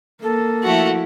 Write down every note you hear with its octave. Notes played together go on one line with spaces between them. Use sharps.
A#3 A4
F3 A3 E4 F#4